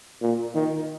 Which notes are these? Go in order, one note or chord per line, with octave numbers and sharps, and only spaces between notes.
A#2
D#3